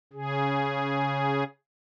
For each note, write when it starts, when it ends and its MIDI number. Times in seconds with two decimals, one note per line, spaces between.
0.13 1.44 49
0.13 1.44 68